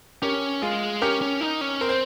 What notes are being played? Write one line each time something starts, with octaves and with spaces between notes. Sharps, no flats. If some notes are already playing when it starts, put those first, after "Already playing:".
C#4 G4 A#4
G#3 F4 G#4
C#4 G4 A#4
C#4
D#4
C#4
C4 A#4
C5